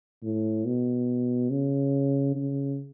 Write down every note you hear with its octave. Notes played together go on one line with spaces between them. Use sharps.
A2
B2
C#3
C#3